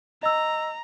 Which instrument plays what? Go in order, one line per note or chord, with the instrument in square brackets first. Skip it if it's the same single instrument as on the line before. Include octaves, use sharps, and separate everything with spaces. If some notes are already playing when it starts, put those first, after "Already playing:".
[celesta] D#5 E6 [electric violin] A#5